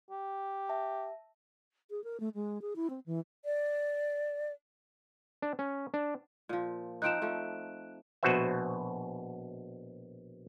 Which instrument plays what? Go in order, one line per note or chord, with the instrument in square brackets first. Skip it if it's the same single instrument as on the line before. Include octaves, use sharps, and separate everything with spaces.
[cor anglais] G4
[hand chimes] E5 A5
[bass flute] G#4
A#4
A3
G#3
G#4
E4
C4
E3
[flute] D5
[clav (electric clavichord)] D4
C#4
D4
[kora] A#2 F3
[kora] F3 C4 D#4 [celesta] F#6 D7 E7
[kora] F3 A3
[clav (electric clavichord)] A#1 B2 F#4 B4 C5 E5